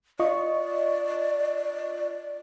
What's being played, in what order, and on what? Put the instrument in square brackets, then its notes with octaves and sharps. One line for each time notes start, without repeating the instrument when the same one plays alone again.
[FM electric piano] F4 D#5 C#6 [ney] D5